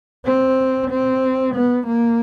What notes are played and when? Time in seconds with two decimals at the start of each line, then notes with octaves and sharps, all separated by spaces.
0.25 C4
0.90 C4
1.55 B3
1.87 A#3